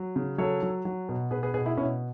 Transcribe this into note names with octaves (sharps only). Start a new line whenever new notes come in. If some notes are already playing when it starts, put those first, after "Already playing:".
Already playing: F#3
C#3
F#3 A4 C#5
F#3
F#3
B2
B2 G#4 B4
G#4 B4
B2 G#4 B4
E4 G#4
B2 C#4 E4